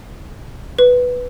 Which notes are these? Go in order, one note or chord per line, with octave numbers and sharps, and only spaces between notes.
B4